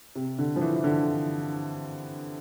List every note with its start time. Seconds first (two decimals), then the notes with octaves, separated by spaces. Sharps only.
0.15 C3
0.38 D3
0.56 F3
0.61 E3
0.76 E3
0.84 D3